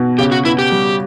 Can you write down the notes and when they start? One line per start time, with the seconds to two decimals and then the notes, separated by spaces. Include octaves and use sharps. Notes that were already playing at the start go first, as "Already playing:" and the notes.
Already playing: B2
0.19 C#3 G4
0.32 F#4
0.45 B3 E4
0.59 G4
0.72 G3